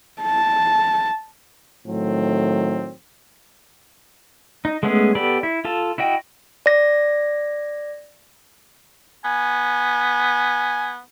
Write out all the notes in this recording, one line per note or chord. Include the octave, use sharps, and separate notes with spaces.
A5
A2 D#3 F#3 A3 C4
D#4
G#3 A3 B3 C#4 G#4
B3 G4 A4 D5 B5
E4
F4 A4 A5
E4 F#4 D#5 G5
D5 A#6
B3 G#5